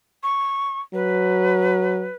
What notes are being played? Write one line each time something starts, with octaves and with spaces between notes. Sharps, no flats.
C#6
F#3 B4